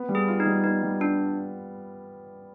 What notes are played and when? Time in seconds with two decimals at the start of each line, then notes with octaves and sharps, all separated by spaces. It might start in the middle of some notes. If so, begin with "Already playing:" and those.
Already playing: B3
0.09 G3
0.15 G#4
0.28 F4
0.40 D#4
0.46 G3
0.64 B3 D#4
0.83 G3
1.00 D4 F4